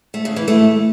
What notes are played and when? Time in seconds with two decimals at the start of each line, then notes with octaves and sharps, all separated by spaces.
0.14 A3
0.25 C#3
0.36 E3
0.48 A3